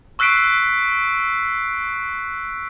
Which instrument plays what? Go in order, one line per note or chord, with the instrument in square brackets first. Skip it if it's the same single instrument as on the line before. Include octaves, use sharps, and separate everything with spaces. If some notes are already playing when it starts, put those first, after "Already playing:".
[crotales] C#6 E6 F#6 B6 C7 D7